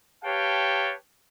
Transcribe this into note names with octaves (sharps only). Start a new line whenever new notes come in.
G4 B4 C#5 F5 G5 A5